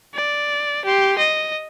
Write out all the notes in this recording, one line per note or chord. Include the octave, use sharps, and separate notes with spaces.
D5
G4 C6
D#5